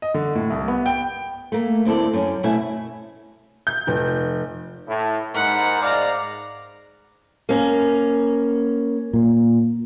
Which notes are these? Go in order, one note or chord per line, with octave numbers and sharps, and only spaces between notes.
D#5
D3
A2
C2
B3
G5
A3 A#3
D2 C4 E4 A4 D5
F#2 C#4
B2 A3 E4 E5 G#5
G6
F1
A2
G#2 A#4 F#5 B5
D5 F5 A#5
A#3 C#4
A#2 A#3